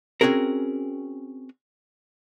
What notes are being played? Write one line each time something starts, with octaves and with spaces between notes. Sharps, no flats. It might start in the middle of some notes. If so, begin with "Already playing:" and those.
C4 C#4 F#4 G#4 A#4